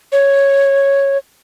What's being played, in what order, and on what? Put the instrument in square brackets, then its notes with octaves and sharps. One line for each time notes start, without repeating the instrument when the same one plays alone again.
[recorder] C#5